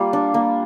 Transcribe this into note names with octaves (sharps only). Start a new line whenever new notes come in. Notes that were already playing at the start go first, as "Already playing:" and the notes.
Already playing: G3 A#3 F4
D4
A#3